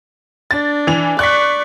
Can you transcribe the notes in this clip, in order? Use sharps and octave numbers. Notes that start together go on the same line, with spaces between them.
D4 A6
E3 F7
D5 C#6 F#6 B6